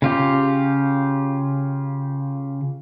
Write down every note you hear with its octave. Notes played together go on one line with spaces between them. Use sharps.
C#3 F4 G4